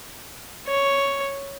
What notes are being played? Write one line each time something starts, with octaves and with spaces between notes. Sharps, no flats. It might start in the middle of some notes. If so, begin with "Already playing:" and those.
C#5